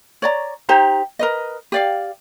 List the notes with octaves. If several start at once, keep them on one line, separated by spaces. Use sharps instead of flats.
C#5 D5 A#5
D#4 G4 C5 A#5
A#4 B4 D#5
G4 D5 F5